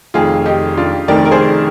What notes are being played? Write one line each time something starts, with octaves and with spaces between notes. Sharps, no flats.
F1 F2 D#3 F4 G#4
D#4 G4
D4 F4
F1 F2 D#3 A#4 D5
A#4
G#4 C5